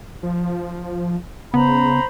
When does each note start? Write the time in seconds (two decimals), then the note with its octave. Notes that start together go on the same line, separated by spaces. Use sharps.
0.23 F3
1.54 C#3 B3 C5 A#5 B5